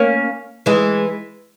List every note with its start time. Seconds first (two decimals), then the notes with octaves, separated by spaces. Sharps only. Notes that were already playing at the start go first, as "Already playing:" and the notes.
Already playing: A#3 C#4
0.66 E3 G#3